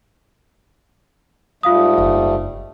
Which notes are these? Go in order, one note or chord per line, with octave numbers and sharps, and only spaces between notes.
G#2 G3 A3 F4 F5 D#6
F#1